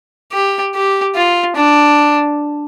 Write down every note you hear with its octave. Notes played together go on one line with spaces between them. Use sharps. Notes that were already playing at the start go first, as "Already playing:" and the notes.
G4
G4
F4
D4